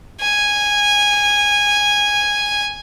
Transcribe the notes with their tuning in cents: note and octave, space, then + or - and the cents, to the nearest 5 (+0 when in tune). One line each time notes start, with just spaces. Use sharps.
G#5 -10